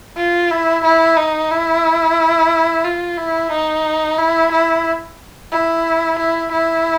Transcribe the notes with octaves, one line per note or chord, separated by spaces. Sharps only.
F4
E4
E4
D#4
E4
F4
E4
D#4
E4
E4
E4
E4
E4